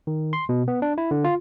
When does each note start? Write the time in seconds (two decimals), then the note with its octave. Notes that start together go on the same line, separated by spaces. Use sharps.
0.07 D#3
0.33 C6
0.49 B2
0.68 B3
0.82 D4
0.98 E4
1.11 D3
1.24 F4